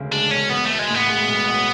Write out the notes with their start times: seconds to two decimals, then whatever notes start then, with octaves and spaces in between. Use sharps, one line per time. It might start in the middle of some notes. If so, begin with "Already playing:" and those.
Already playing: E1 D2 C#3 G#3
0.11 G#3 D4
0.31 E1 C#4
0.50 B1 B3
0.65 B1 A3
0.79 G#3
0.89 A2 B3
1.08 G#3
1.27 B1
1.47 B1